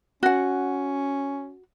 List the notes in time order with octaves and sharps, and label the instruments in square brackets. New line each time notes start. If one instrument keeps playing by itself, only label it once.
[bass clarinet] C#4 [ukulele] F#4 F#5